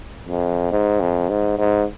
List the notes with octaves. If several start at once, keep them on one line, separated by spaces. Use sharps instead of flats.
F2
G#2
F2
G#2
G#2